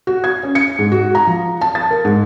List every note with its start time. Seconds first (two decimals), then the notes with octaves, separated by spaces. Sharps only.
0.07 F#4
0.24 G#6
0.43 C#4
0.55 C#7
0.78 G#2
0.92 F#4
1.15 A#5
1.27 F3
1.61 A5
1.75 A6
1.91 A#4
2.05 G#2